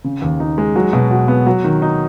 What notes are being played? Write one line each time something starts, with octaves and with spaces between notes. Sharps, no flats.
C#3
D#2
D#4
G#3
F#3
B2
F#4
B3
F#3
D#3
D#4